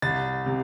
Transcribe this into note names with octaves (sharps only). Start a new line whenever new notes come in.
C2 A6
C3